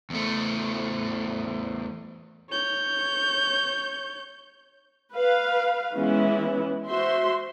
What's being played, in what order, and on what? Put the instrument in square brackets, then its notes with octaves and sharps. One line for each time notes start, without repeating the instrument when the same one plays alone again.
[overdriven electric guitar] E2 A3
[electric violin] C#5 G6
[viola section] B4 F5
E3 G#3 B3 C#4 E4
F#4 C5 E5 C6